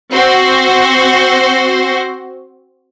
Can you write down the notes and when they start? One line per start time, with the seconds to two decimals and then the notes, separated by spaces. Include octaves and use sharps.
0.14 C4 F#4 C5